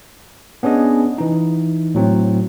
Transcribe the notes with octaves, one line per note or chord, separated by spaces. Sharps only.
B3 C#4 D4 G#4 D#5
E3 D#4
A2 F#3 C4